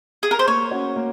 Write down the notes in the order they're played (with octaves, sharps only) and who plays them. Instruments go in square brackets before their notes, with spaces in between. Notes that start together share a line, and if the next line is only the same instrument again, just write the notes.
[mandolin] G#4
A#4
C5
[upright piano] A#3 [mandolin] C#5
[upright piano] C#4 F#4
A#3